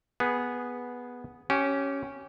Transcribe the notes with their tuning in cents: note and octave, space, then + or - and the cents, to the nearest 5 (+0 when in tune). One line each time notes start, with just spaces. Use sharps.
B3 -5 G#4 +0
C#4 +0 G4 -20